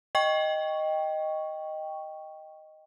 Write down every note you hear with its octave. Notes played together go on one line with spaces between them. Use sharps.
D#5 G5 C#6